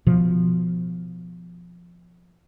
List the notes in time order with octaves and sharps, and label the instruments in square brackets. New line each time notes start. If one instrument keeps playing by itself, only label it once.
[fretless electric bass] B2 F3